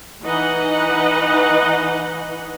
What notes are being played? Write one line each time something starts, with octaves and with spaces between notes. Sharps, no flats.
E3 D#4 B4 D#5 F#5